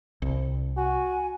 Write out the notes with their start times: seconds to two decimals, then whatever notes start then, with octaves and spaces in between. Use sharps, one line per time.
0.22 C2
0.77 F#4 G#5